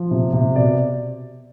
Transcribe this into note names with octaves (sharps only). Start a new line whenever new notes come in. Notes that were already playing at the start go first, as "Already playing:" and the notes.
Already playing: F3
C3
C3
B2 D5